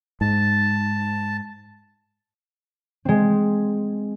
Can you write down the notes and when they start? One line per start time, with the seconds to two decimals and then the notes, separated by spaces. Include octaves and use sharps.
0.21 G#2 A5
3.05 G#3 C4